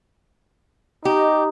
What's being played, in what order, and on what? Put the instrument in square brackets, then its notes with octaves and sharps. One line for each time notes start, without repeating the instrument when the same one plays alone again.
[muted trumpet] D#4 [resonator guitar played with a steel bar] G4 [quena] D#5